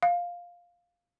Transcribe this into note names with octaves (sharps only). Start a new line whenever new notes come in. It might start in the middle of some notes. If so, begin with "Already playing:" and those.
F5